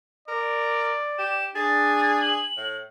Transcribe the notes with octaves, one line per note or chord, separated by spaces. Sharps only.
A#4 D5
G4 E7
D4 G#4 A6
F#7
A2